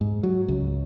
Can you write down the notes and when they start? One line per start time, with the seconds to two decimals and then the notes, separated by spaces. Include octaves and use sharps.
0.01 G#2
0.23 F#3
0.48 C#2